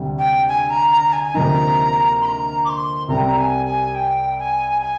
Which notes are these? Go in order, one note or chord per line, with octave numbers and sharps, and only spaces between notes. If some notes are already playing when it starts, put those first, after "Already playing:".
Already playing: D2 C3 G3
G5
G#5
A#5
A#5
G#5
G#5
D2 C3 F3 A#3 D#4 A#5
C6
A#5
D6
C6
C2 C3 G3 A#5
G#5
G#5
G5
G#5
G#5